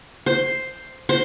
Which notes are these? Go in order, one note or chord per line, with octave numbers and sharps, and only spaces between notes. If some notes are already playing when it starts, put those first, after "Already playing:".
C5
C5